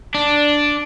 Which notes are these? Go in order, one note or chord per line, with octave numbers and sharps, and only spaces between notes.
D4